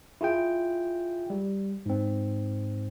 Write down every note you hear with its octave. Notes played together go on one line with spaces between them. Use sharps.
E4 F4 G#4 G5
G3
G#2 C4